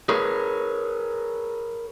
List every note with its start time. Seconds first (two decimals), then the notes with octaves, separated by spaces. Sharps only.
0.09 G#4 A#4 B4 C#5